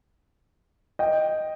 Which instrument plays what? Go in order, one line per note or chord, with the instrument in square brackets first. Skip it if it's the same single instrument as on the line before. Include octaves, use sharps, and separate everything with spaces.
[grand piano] D#5 G5